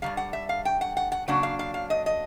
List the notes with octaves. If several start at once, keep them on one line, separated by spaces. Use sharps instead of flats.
G2 D#3 G3 F5
F#5
E5
F5
G5
F#5
F#5
F#5
C#3 F#3 A#3 D4 F#5
F5
F5
F5
D#5
D#5